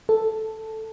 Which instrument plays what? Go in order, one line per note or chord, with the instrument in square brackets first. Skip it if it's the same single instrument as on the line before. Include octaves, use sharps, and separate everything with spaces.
[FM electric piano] A4